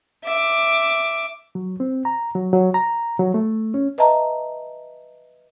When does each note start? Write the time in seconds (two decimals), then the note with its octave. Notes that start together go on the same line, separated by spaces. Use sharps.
0.24 E5 D6
1.55 F#3
1.80 C4
2.05 A#5
2.35 F#3
2.53 F#3
2.74 A#5
3.19 F#3
3.34 A3
3.74 C#4
3.98 B4 D#5 E5 A5 A#5